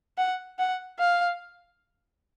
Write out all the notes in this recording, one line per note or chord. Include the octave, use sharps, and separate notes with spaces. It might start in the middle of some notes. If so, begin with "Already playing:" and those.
F#5
F#5
F5